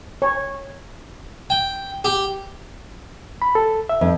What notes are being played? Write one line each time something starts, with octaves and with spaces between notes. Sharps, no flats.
C#5
G5
G4
B5
A4
E5
F2